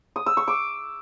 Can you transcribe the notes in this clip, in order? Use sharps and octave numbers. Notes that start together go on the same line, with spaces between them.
D#6
E6
C#6
D6